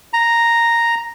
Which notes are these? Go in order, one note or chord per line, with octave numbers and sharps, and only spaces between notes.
A#5